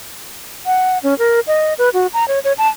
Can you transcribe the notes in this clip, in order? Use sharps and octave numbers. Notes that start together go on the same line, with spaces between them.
F#5
C#4
A#4
D#5
B4
F#4
A#5
C#5
C#5
A5